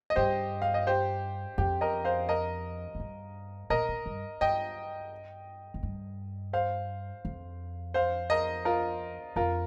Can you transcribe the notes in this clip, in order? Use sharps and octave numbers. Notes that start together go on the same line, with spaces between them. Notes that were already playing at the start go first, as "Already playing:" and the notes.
D#5
G2 G4 C5
F5
D#5
G4 C5
F2 G4
A#4 D#5
C5 F5
A#4 D#5
F2
G2
A#2 A#4 D#5
A#2
G2
G2 D#5 G5
F2
G2
C5 F5
F2
C5 F5
A#4 D#5
F4 A#4
F2 F4 A#4